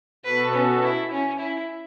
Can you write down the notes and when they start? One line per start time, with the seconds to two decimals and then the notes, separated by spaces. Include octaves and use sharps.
0.25 B2 B3 F#4 A4 B4
0.54 C#4
0.83 E4
1.11 C#4
1.39 E4